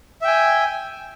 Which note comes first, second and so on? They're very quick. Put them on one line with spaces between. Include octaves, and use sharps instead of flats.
E5 G5 G#5